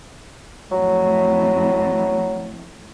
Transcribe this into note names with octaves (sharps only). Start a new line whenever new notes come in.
F2 A2 F#3